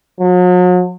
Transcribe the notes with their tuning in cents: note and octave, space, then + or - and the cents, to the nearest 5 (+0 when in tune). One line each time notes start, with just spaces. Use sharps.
F#3 -40